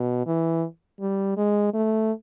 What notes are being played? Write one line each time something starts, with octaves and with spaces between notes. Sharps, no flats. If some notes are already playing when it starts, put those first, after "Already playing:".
Already playing: B2
E3
G3
G#3
A3